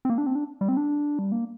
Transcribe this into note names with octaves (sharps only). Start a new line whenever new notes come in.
C4
A#3
D4
C4
D4
G3
C4
D4
G3
A#3